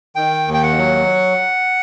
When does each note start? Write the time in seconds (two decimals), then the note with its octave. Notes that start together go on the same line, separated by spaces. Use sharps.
0.16 D#3 G5
0.47 D#2
0.54 G5
0.63 F#5
0.78 F#3